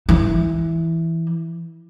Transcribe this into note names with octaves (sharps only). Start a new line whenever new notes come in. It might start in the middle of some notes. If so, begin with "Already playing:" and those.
E3